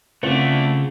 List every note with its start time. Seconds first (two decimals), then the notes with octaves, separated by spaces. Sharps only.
0.23 C#3 A3 C4 D4 F4 C5 F#5